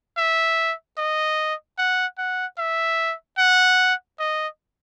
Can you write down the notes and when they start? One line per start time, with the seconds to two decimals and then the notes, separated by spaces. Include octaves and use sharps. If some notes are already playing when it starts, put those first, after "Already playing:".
0.18 E5
0.98 D#5
1.78 F#5
2.18 F#5
2.59 E5
3.38 F#5
4.20 D#5